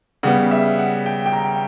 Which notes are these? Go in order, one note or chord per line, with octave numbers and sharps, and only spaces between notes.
C#3 G3 B3 F#5
E5
F#5
G5
G5
A#5